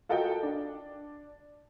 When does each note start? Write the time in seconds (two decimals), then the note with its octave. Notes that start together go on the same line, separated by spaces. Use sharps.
0.09 F4 F#4 A4 A#4 D#5 G5
0.43 D4